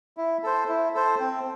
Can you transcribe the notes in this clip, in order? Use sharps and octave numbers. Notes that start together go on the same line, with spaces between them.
E4
A4 C5
E4
A4 C5
C4